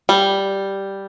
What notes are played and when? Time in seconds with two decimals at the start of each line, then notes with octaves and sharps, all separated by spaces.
0.09 G3